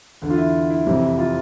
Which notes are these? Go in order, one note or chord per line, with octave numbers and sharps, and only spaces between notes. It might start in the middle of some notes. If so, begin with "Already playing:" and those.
E2 D3
F4
E4
E4
F2 C3 E3
F4